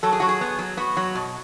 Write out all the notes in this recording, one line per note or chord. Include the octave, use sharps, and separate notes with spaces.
F#3 A4
G#4
F#3 F#4
G#4
B3
F#3
B3 F#4
F#3
B2